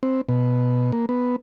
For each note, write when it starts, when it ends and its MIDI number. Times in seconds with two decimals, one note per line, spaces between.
0.03 0.21 60
0.29 0.91 47
0.92 1.06 58
1.09 1.36 59